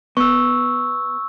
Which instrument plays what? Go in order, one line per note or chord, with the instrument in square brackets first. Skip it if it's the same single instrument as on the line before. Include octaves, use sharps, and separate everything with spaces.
[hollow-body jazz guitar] B3 [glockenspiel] C#6 E6